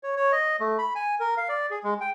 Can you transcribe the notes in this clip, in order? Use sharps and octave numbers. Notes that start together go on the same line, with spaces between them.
C#5
C#5
D#5
A3
B5
G#5
A#4
F5
D5
G#4
G#3
G5